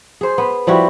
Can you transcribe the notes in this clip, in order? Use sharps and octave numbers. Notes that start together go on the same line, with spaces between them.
G#4 C5
B3
F3 G3 E4 F#4